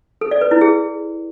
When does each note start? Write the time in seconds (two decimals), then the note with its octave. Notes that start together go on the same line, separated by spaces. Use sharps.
0.21 A4
0.31 D5
0.41 B4
0.51 E4
0.61 G#4